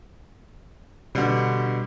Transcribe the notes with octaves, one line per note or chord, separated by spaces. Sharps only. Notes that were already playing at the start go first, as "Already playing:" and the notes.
B2 D3 G3